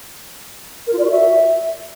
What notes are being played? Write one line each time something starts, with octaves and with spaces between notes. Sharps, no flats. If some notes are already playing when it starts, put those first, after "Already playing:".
A#4
F4
D5
F#4
E5